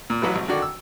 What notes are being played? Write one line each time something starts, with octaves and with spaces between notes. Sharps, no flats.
A#2
A1 F#3 E4 B4
G#1
D3 D#3 D4 F#4
E6